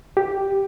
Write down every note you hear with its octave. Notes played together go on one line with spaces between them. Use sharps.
G4